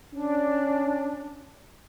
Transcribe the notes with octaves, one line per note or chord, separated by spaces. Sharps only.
C#4 D4